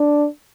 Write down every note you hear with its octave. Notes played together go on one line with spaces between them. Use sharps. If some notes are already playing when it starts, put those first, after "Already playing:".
Already playing: D4